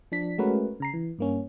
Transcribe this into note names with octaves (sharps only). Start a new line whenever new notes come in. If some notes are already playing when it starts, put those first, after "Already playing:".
F3 D4 B6
G#3 A3 C#4 F#4 A#4 B4
C#3 A#5 C7
E3
G2 A#3 C#4